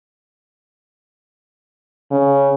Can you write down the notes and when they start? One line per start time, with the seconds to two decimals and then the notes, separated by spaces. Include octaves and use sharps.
2.11 C#3